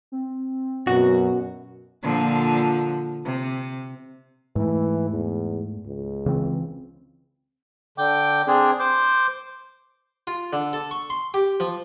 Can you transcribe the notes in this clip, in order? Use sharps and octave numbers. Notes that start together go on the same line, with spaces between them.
C4
F#2 B2 F#4
A#2 D3 F3
C3
G#2 E3 A3
E2
C#2
C#3 E3 C4
D3 G5 D6
C4 D4 G#4
C5 D6 G6
F4
D3
A4
C#6
C6
G4
F3